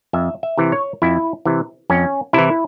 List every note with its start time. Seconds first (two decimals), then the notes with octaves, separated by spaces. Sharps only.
0.13 F2 E5
0.43 E5
0.58 C3 E3
0.72 C#5
1.02 F2 E4
1.45 C3 E3
1.90 F2 C#4
2.33 C3 E3 E4